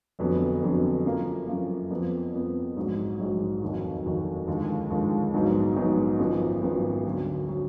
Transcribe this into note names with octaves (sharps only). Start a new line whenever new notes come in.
F1 F2 D3 F#3 B3
F1 F2 D3 F#3 B3
F#2 F3 A#3
F#2 F3 A#3
F2 F3 B3
F2 F3 B3
A#1 G#2 F#3
A#1 G#2 F#3
F1 D#2 D#3 F#3
F1 D#2 D#3 F#3
D#2 D3 F3 G#3
D#2 D3 F3 G#3
A#1 G#2 F#3 B3 D#4
A#1 G#2 F#3 B3 D#4
G#1 F#2 F3 B3
G#1 F#2 F3 B3
D2 D3 F#3
D3 F#3